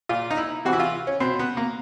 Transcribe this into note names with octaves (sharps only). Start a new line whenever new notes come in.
A#2 F4
D#4
E4
C3 E3 F#4
E4
F4
C#4
B2 C4
B3
A#3